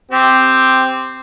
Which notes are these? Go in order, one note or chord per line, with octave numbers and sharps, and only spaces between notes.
C4 G4